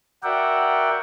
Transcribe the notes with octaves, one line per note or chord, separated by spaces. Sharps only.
F#4 A#4 D5 E5 F#5 G5